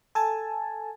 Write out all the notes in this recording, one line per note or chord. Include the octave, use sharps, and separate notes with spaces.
A4 G#5 A5